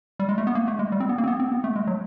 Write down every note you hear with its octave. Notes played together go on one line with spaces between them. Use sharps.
G3
G#3
A3
B3
A#3
A3
G#3
G3
C4
B3
A#3
C4
B3
C4
B3
A3
G#3
F#3